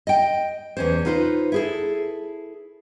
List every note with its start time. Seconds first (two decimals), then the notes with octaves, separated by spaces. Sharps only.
0.07 D#5 G5
0.77 E2 C#4 C5
1.05 D#4 F4 B4 C5
1.52 E4 G#4 A4